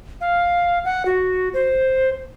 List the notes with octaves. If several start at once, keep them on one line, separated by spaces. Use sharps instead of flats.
F5
F#5
F#4
C5